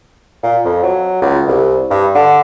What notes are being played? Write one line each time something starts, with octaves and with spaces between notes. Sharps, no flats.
A#2
F2
F#3
C#2
C2
G2
D3